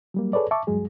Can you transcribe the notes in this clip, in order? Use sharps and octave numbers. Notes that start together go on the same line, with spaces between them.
F#3 G3 A#3
G#4 A4 B4 C#5 D5
E5 A5 C#6 D6
D2 G2 F#3 G#3 G#4